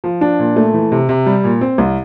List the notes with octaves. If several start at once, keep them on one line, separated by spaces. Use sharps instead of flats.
F3
D4
A#2
A3
E3
C3
C3
G3
A#2
C4
C2